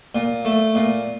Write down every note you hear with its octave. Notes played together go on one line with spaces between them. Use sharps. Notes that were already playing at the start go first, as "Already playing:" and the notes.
A#2
A3
A#2